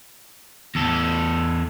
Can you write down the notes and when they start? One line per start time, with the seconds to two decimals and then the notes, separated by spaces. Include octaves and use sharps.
0.75 E2 A4